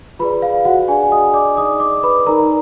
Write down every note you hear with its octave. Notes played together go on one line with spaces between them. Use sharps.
F4 G#4 B4 D5 B5
F5
F#4 F#5
D4 G#4 D5 G#5
D#5 D#6
D5 D6
D#4 G#4 D5 D#5 D#6
D5 D6
B4 B5
D#4 A#4 D5 A#5